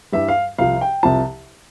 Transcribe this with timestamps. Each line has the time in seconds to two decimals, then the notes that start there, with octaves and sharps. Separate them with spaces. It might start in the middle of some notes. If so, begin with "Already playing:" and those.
0.12 G2 E3 G3 E5
0.28 F5
0.58 C2 C3 F3 F5
0.81 G5
1.03 C2 C3 F3 A5